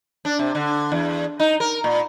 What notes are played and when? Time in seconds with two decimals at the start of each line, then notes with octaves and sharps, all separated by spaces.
0.25 D4
0.39 C3
0.55 D3
0.92 E2
1.40 D#4
1.60 A#4
1.84 A#2